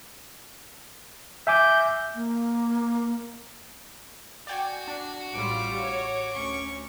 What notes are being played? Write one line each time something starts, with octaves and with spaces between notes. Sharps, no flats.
E5 G#5 D6 G6
A#3
F#4 D5 G5 G#5
D4
A1 G3 F4 D6
C#5
D2 C#4 C#6